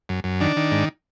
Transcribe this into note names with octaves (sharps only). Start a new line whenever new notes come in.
F#2
F#2
D#3 D4
D#3
G#2